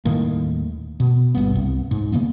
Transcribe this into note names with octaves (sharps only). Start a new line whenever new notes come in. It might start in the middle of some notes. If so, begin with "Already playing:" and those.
D#1 A2 D#3 A#3
B2
G1 E2 G2 B3
C2
G#2
C#3 E3 A#3 B3